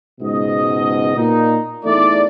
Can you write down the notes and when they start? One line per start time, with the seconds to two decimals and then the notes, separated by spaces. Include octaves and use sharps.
0.21 C#2 G#2 B2 D#5
1.17 A#2 D#4
1.85 E2 A3 D#4 D5